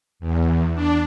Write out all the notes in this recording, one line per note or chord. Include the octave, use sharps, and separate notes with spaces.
E2
D4